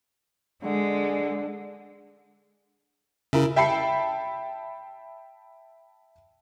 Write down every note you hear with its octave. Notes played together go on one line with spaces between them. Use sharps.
D3 G#3
C#3 E4 A#4 E5
E5 G5 A5 B5 C7 C#7